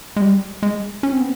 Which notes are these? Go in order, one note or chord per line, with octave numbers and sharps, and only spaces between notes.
G#3
G3
G#3
C#4
C4
B3